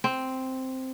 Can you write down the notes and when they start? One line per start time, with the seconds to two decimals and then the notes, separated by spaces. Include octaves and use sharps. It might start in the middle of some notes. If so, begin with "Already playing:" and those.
0.04 C4